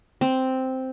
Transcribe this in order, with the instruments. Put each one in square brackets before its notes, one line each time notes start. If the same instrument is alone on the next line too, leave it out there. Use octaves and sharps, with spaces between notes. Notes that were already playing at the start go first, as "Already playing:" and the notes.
[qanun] C4